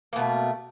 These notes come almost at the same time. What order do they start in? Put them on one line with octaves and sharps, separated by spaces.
A#3 B2 A3